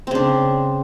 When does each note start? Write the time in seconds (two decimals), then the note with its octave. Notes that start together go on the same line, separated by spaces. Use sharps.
0.07 C4
0.11 C#3
0.15 D4